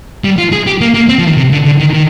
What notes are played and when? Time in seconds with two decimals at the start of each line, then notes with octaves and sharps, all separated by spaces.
0.24 G3
0.38 F4
0.52 G#4
0.67 G4
0.81 A#3
0.94 A#3
1.09 C4
1.19 F3
1.27 D#3
1.37 C3
1.52 D3
1.65 D3
1.80 D#3
1.93 D#3